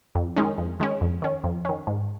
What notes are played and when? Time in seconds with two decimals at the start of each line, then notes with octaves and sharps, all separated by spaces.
0.15 F2
0.36 D#3 G#3 C#4
0.58 F2
0.80 D#3 G#3 C#4
1.01 F2
1.22 D#3 C#4
1.44 F2
1.65 D#3 C#4
1.87 G#2